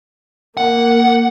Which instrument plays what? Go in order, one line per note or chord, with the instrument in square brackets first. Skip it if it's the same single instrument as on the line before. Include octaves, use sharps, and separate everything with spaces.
[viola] A#3 [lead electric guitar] F#5